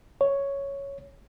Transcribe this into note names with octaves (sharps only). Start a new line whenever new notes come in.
C#5